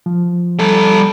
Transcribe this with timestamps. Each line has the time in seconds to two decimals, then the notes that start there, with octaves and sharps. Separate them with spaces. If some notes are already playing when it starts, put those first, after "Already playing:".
0.06 F3
0.59 G3 A4